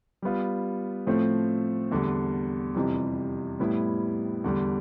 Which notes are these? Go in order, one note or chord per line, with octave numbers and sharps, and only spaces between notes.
G3 B3 F4
A2 F3 A3 C4
E2 D3 G3
F2 C3 E3 G3
A2 G3 B3 E4
E2 D3 G3